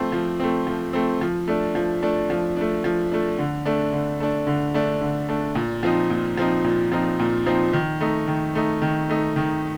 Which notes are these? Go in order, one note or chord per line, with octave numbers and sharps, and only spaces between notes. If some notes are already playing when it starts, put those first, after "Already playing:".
Already playing: F3 A3 C4
F3
A3 C4
F3
A3 C4
F3
A3 D4
F3
A3 D4
F3
A3 D4
F3
A3 D4
D3
A3 D4
D3
A3 D4
D3
A3 D4
D3
A3 D4
A#2
F3 C4 D#4
A#2
F3 C4 D#4
A#2
F3 C4 D#4
A#2
F3 C4 D#4
D#3
A3 D#4
D#3
A3 D#4
D#3
A3 D#4
D#3